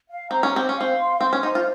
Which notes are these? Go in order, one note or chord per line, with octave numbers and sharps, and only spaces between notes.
F5
C4 A#5
C#4
C4 G4
C#4
C4 F5
C6
C4 C5
C#4
D#4 C5
F4